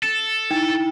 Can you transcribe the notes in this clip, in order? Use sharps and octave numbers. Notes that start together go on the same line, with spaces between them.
A4 A6 E7
D#4 E4 G5 A6